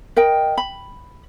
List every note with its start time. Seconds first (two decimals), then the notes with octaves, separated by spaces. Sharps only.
0.17 A#4 D#5 G5
0.58 B5